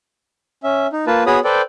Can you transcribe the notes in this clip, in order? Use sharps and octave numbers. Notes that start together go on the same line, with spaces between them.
C#4 E5
D#4
A#3 F4 B4 A5
B3 F#4 G#4 C#5 B5 D#6
A4 B4 C5 D5 G5